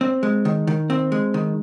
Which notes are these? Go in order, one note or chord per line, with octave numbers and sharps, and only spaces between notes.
C4
G#3
D#3
D#3
C4
G#3
D#3